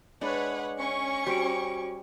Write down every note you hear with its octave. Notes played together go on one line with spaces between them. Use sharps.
G#3 D4 B4 C#5 D5 F#5
C#4 C#6
G3 F#4 G4 C5 D7